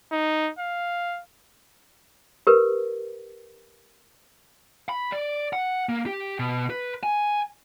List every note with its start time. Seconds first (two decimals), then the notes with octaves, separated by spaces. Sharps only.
0.12 D#4
0.59 F5
2.47 G4 A#4 B4
4.89 B5
5.12 D5
5.53 F#5
5.89 A#3
6.06 G4
6.39 B2
6.70 B4
7.03 G#5